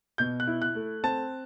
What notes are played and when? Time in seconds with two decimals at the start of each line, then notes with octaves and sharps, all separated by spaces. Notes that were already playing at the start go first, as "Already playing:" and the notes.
0.18 B2 G6
0.40 F#6
0.47 E4
0.62 F#6
0.75 A3
1.03 C4 A5